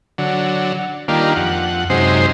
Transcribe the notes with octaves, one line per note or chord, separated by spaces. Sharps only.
D3 F#3
D#3 G3 A#3 D4 F4
F2 F#5
F#2 C3 G#3 D#4 C5